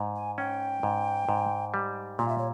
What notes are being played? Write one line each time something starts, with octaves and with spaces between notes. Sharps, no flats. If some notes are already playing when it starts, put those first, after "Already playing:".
Already playing: G#2
G#5
C#4 G5
G#2
G#2
G3
A#2 F5
E5
C#5